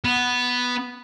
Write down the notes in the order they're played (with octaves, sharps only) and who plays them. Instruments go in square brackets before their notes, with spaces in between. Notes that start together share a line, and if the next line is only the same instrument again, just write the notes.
[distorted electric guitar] B3